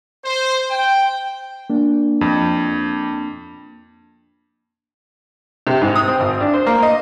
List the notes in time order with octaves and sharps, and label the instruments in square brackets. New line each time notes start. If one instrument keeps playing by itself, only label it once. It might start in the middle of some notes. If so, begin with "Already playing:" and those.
[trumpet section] C5
G5
[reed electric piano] A#3 D4
[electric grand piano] F2
[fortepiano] C3
G#2
D#6
C4
G#1
D4
C5
A#3
D#5